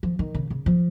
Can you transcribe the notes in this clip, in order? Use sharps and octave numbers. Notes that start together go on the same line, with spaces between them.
F3
D#3
C#3
C#3
F3